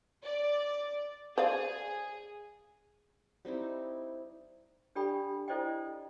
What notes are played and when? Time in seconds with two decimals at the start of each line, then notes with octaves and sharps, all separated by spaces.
0.24 D5
1.38 G#4 C5 D5 F5
3.45 G3 C4 D#4 E4
4.95 D4 G4 A4 D5 G5 B5
5.48 E4 A4 C5 D5 D#5 G5